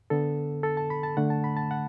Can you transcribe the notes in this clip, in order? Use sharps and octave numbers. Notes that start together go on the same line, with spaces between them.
D3 B3 A4
A4
A5
B5
A5
D3 A3 F#5
A5
B5
A5
F#5